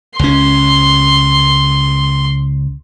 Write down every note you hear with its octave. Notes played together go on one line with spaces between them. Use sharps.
C#2 C#4 C6